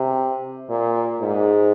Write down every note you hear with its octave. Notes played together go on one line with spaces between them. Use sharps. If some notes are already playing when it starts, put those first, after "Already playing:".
Already playing: C3
A#2
G#2